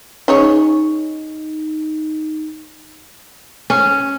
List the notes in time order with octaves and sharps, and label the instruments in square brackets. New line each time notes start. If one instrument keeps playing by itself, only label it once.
[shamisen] C#4 G#4 C#5 [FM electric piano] D#4
[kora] C#4